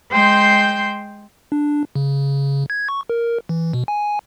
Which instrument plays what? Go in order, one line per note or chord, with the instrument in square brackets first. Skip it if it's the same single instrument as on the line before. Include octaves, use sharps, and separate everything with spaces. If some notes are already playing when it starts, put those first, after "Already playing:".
[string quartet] G#3 C5 G5 C6 G6
[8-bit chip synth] D4
C#3
G#6
C#6
A#4
E3
B2
G#5